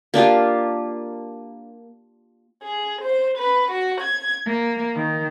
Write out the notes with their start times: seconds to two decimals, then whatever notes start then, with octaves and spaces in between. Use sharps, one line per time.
0.14 A#3 D4 F4 G4
2.64 G#4
3.01 C5
3.38 B4
3.72 F#4
4.01 G#6
4.45 A#3
4.95 D#3